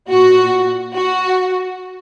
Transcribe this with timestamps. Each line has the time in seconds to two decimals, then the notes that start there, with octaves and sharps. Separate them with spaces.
0.11 A#2 F#4
0.94 F#4